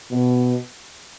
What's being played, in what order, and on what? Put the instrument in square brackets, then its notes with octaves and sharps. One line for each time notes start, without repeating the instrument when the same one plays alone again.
[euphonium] B2